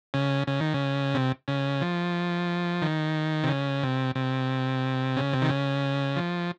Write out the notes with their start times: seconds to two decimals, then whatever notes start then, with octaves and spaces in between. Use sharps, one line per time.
0.14 C#3
0.47 C#3
0.60 D#3
0.74 C#3
1.15 C3
1.48 C#3
1.81 F3
2.82 D#3
3.43 C3
3.49 C#3
3.83 C3
4.15 C3
5.17 C#3
5.33 C3
5.42 D#3
5.50 C#3
6.16 F3